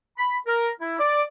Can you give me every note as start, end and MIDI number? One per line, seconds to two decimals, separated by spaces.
0.17 0.35 83
0.46 0.68 70
0.80 0.98 64
0.99 1.22 74